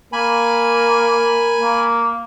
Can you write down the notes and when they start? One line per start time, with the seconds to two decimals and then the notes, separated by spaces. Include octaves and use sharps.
0.13 A#3 A#4 G#5 B5
1.58 A#3